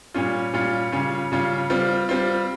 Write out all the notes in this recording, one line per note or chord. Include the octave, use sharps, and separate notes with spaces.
A#2 G3 C#4 F4
A#2 G3 C#4 F4
C#3 G3 C#4 F4
C#3 G3 C#4 F4
G3 C4 F4
G3 C4 F4